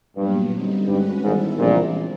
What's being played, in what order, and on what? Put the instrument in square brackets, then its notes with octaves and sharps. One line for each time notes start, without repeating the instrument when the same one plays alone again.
[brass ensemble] G2 [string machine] A#2 F#3 B3
[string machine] D3 G3 C4 D#4
[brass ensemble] G2 [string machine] G#3 C#4 F#4 B4
[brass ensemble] G#1 G#2 [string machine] D#3 G3 B3 E4 A4
[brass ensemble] A#1 A#2 [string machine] C#3 E3 G#3 C4